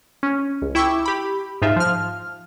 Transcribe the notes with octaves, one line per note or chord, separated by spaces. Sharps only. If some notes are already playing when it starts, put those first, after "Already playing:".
C#4
C#2
E4 G5 C#6 D6 E6
G4 B5
G#2 D#4 F4 E5
F3 F6